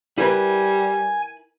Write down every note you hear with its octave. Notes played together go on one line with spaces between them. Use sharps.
G3 E4 A#4 B4 G#5